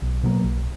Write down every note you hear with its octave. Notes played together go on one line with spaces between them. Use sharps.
B1
B2 F#3 A#3
B1